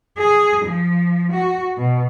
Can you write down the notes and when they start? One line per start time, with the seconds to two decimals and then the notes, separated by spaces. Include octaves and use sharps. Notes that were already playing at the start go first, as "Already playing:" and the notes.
0.18 G#4
0.65 F3
1.32 F#4
1.77 B2